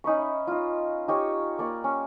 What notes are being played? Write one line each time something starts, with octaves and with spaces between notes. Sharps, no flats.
C#4 D#4 B5 C#6
E5
D#4 F4
D#4 G4 C#5 G#5
A#3 D5 C#6
C#4